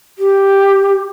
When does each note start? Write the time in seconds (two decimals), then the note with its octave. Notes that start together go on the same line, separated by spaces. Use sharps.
0.19 G4